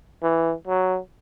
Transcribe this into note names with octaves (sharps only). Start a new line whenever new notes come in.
E3
F#3